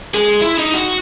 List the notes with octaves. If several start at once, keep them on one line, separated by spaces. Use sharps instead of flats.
G#3 G#4
E4
D#4
F#4